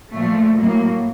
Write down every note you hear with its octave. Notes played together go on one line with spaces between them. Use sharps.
A#2 F3 A3
A2 F#3 A#3